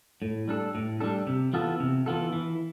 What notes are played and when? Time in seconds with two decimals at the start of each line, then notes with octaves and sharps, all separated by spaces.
0.22 A2
0.48 G3 D4 A4
0.75 A2
1.00 G3 D4 A4
1.27 C3
1.53 E3 B3 F4 A4
1.80 C3
2.06 E3 B3 F4 A4
2.33 E3